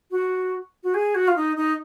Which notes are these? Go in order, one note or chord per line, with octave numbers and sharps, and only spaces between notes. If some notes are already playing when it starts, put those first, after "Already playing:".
F#4
F#4
G#4
F#4
F4
D#4
D#4